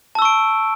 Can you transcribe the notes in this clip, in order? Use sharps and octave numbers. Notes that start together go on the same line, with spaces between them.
A5 C#6 E6 D7